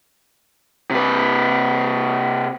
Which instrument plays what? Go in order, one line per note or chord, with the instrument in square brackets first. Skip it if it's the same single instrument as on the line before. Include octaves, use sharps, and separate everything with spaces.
[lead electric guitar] C3 B4